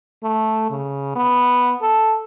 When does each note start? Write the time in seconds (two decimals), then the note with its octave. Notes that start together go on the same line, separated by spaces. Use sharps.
0.23 A3
0.70 C#3
1.16 B3
1.82 A4